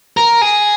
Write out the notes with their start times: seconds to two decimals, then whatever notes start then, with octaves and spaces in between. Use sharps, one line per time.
0.17 A#4
0.42 G#4